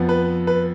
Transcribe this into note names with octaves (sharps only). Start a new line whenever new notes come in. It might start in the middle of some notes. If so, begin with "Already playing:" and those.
Already playing: F2 F3 B3
B4
B4